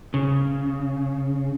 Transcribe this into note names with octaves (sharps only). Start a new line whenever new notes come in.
C#3